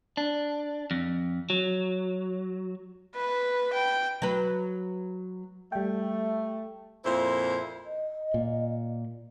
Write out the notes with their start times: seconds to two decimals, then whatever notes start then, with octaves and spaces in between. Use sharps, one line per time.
0.17 D4
0.91 F2
1.50 F#3
3.15 B4
3.73 G5
4.22 F#3 B4
5.72 G3 A3 G5
7.05 F2 A#2 E4 C5
7.85 D#5
8.34 A#2